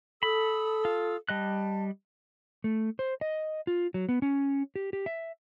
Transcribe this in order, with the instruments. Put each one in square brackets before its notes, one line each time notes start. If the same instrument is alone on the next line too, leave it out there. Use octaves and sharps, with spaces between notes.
[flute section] A4 D#6 E6 [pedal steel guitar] B5
[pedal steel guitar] F4
[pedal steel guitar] G3 D#5 F#6 [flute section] A5
[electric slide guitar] A3
C5
D#5
F4
F#3
B3
C#4
G4
G4
E5